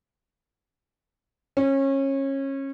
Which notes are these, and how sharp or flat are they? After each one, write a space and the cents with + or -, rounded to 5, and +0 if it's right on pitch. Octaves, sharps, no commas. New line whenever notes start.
C#4 -25